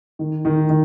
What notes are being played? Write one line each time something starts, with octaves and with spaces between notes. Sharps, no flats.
D#3
D#3
D#3